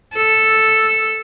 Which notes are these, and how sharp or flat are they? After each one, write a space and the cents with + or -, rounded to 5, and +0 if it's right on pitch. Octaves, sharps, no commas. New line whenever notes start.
A4 +0